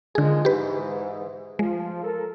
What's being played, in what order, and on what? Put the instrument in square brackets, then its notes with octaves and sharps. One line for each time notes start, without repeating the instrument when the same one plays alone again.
[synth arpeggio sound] D3 G#4 [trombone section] D#3 F3 G#3
[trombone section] G#2 E3 [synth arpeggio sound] G4 B4
[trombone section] F3 [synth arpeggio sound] G#3
[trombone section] A4 A#4